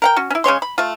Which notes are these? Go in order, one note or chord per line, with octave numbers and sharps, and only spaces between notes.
A#4 F#5 G5
C#4 F#4
C#4 E4
C#3 G#3 C#5 C6
B5
A3 F4